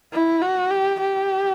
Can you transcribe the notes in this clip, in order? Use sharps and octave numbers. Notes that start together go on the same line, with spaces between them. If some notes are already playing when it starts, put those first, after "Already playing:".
E4
F#4
G4
G4